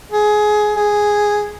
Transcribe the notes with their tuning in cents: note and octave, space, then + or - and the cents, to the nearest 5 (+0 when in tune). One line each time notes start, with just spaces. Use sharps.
G#4 +15
G#4 +0